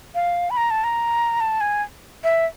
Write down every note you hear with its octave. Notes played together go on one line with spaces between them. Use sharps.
F5
B5
A#5
A5
A#5
A5
G#5
E5